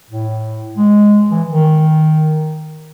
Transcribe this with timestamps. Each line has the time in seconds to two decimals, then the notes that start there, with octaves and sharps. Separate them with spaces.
0.10 A2
0.77 G#3
1.31 E3
1.49 D#3